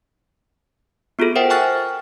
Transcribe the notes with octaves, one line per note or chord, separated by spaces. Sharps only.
B3 F4 F#4 G#4 A4
A#4 C5 E5 F#5 G5
G5 G#5 C#6 F6 F#6 A6